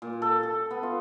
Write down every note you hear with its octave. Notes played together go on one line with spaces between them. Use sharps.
A#2
A4
A4
B3
F4